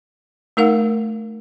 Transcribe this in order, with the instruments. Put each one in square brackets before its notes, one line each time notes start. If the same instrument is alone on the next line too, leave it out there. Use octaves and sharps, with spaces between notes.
[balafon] A3 D#4 A#4 F5 F#5